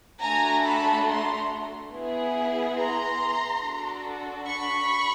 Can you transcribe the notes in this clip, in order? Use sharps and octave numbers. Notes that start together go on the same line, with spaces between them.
A3 D4 F#4 A4 G#5 A#5
A5 B5
A#5 C6
B3 E4 G#4
A#5 C6
D4 F#4 A4
B5 C#6